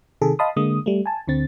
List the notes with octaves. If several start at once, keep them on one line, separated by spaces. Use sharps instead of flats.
C3 D#3 G#4 A4
D#5 F5 A5 B5 C6 D#6
D3 G#3 A#3 D#6
G3 A3
G#5 A5
D2 D3 C4 A6